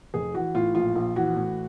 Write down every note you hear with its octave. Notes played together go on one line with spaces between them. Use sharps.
F1 G#4
E3 F#4
A2 F4
A#1 F4
A#1
E3 F#4
A2